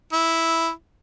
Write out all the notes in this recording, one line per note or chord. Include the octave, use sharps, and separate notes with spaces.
E4